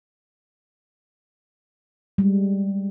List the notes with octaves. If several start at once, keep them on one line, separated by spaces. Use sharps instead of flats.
G3 G#3